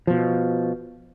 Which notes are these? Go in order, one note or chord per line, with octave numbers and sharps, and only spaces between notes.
B2 F3